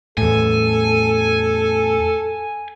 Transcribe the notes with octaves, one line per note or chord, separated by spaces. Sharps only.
E2 A2 A4 G#5